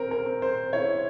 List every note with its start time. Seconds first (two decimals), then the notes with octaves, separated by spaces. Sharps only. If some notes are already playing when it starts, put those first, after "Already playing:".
Already playing: C4 A#4
0.11 A#4
0.26 C4
0.42 C5
0.73 E4 C#5